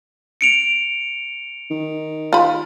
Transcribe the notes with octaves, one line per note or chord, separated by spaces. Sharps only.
C#7 D7 F7
D#3
F4 B5